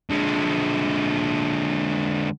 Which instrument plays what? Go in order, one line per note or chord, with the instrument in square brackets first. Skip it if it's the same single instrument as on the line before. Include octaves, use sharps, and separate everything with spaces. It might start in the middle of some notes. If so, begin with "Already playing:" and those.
[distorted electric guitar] D3 G#3